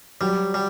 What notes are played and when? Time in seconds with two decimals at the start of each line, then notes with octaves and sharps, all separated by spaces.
0.21 F#3 G3
0.54 G3